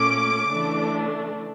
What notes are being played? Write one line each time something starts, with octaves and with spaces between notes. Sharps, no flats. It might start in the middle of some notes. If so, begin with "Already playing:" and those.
Already playing: A#2 A3 C#4 D6
C#3 E3 A3 D4